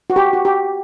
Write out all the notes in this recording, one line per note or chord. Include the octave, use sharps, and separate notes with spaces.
F#4
G4
F#4
G4